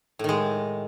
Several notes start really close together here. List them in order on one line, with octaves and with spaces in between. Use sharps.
A2 D#3 G#3